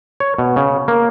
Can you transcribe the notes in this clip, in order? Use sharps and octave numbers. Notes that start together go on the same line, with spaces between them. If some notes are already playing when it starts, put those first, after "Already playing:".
C#5
B2
C#3
A#3